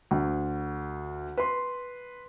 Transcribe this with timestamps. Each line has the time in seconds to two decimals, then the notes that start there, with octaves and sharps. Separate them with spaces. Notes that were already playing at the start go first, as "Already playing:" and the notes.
0.11 D2
1.37 B4 C6